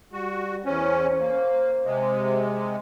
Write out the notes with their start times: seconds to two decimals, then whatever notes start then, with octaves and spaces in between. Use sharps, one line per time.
0.13 G3 F#4
0.65 E2 C#4 C5
1.20 A#3
1.85 C3 G#3